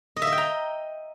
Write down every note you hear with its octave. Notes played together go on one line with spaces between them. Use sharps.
D#5
E5
D#5
G5
A#5